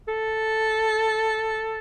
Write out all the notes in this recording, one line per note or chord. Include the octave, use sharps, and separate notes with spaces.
A4